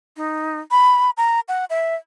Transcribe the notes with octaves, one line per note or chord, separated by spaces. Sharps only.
D#4
B5
A#5
F#5
E5